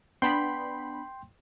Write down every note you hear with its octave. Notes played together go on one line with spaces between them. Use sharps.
B3 D4 G5 B5 C6